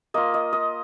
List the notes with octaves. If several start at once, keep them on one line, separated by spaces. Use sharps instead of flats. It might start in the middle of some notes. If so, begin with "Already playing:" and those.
A#3 F4 D#5
D#5
D#5